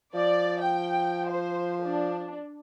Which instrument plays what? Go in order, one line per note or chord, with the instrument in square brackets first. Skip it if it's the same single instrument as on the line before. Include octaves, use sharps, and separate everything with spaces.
[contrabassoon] F3 [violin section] D5
[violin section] G5
C5
D4